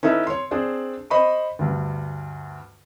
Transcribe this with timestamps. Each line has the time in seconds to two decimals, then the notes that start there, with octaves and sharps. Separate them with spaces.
0.03 C#4 D#4 E4 A4 B4
0.27 C#5 C6
0.51 C4 D4 G#4 C5 D5
1.10 C5 D#5 B5 C#6
1.59 D2 G2